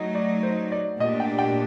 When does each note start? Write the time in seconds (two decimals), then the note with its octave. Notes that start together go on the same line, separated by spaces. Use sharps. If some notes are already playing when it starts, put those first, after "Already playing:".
Already playing: F#3 A3 D#4 D#5
0.15 D5
0.43 C5
0.72 D5
1.00 A#2 A3 D4 G4 D#5
1.20 G5
1.39 G5